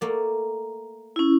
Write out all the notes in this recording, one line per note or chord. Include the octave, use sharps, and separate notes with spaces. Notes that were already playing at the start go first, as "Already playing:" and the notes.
A3 A#3 D5
C#4 E4